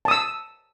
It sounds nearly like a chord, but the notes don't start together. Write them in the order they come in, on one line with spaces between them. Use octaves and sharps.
A5 D#6 E6